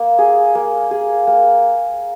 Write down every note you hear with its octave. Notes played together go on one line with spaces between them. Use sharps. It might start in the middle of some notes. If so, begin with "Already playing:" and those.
Already playing: A#3
G#4
A#3
G#4
A#3